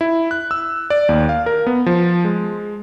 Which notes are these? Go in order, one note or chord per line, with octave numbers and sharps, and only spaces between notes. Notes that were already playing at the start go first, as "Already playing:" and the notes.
E4
F#6
E6
D5
D#2
F5
A#4
B3
F3
G#3